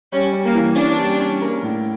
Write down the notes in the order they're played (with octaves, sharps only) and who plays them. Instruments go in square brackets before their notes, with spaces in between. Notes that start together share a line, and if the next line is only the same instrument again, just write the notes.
[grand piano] G3 [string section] C#4
[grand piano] G3
[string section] A#3
[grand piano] E3
[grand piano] C#4 [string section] D4
[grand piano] G3
C#4
A#3
A2